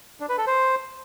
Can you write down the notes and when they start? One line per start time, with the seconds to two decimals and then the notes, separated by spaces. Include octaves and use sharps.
0.20 D4
0.29 B4
0.38 A4
0.47 C5